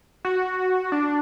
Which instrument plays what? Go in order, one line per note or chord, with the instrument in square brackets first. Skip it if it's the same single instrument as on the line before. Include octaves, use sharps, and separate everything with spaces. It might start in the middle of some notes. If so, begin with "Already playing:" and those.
[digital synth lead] F#4
D4